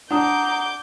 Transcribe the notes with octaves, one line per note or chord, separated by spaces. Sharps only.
D4 F#5 A#5 D6 D#6 G6